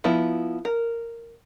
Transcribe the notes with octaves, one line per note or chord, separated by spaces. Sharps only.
F3 B3 E4
A#4